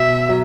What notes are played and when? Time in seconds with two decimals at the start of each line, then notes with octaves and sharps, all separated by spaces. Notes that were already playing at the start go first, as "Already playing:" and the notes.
Already playing: B2 E5
0.29 F#3